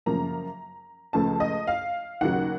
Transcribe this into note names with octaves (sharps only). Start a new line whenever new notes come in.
F#2 C#3 F3 A#3 A#5
C#2 C#3 F3 A3 A5
D#5
F5
D#2 C#3 F#3 F#5